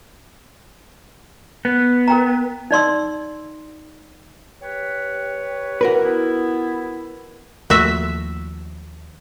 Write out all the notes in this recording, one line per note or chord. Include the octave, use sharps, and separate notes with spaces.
B3
A#4 G5 A#5
D#4 D5 C6 E6
G4 B4 C#5
E3 F#4 A#4 B4
B3 E4
D#2 F3 A3 F#4 E5